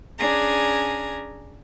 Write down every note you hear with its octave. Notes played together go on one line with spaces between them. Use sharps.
C#4 D4 G#4 G#5 A#5